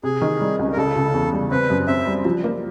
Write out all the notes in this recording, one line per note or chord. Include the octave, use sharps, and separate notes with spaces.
C3 G#4
D#3
G3
C#2
A#4
C#3 A4
C#3
E2
G3
C4 B4
F#2
C4 E5
G3
F3
A#3